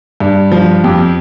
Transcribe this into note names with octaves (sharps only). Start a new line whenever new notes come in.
G2
F3
F2 G4